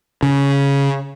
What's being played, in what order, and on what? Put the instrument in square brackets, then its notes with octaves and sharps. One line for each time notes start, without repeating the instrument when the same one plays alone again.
[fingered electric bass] C#3